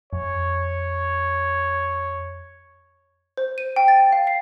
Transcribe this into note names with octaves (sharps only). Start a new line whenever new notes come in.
F2 C#5
C5
D#7
G5
A6
F5
C7